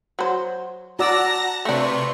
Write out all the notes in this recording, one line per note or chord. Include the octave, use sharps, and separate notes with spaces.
F#3 C5
F#4 D5 F#5 A5 A#5 E6 A#6
C3 A3 D4 F4 B4 C#6